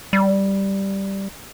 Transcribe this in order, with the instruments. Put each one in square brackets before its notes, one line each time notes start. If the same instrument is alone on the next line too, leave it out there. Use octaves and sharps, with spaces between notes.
[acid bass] G3